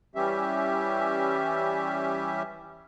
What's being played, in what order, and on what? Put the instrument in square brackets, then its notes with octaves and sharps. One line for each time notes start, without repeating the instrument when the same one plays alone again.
[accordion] E3 G3 C#4 G4 E5